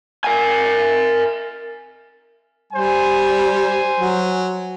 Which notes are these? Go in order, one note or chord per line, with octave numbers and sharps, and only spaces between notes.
A#4 G#5
G3 C5 G#5
F#3